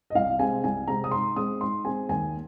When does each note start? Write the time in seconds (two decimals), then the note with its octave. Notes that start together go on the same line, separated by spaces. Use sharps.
0.10 D#5
0.15 C2 F5
0.39 C3 G#3 C4 G#5
0.64 C2 G#5
0.88 C3 G#3 C4 A#5
1.04 D#6
1.11 G#2 C6
1.36 G#3 C4 D#6
1.60 G#2 C6
1.84 G#3 C4 G#5
2.09 D#2 G#5